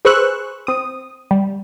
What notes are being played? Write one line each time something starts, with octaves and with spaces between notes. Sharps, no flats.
G#4 B4 C5 C#6 E6 F#6
C4 D#6
G3